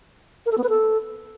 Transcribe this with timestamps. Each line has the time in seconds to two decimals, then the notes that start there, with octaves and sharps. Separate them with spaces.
0.46 A#4
0.52 A4
0.58 B3
0.63 B4
0.69 A4